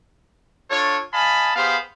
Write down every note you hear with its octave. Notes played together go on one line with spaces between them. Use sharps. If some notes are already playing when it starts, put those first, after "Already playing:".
D4 F4 A4 C#5
D#5 F5 G#5 A5 B5
B3 G4 G#4 C5 F5 B5